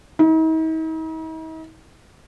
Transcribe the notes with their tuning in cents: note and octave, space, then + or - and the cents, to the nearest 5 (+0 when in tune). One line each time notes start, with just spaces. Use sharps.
D#4 +45